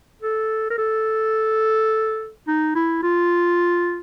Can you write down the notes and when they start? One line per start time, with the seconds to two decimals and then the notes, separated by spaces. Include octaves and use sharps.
0.22 A4
0.70 A#4
0.78 A4
2.48 D#4
2.75 E4
3.03 F4